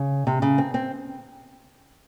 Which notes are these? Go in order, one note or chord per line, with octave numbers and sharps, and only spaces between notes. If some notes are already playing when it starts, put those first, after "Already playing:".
Already playing: C#3
C3
C#3
C4
C4